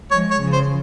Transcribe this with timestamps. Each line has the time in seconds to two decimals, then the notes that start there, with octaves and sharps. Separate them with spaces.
0.10 F3 G#3 C#5
0.31 C#5
0.41 C#3 F3
0.53 C5